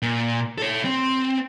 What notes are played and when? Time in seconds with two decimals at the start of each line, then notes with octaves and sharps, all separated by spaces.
0.02 A#2
0.58 A4 C#5
0.85 C4